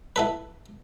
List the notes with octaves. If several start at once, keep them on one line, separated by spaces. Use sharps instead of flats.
E4 A4 B4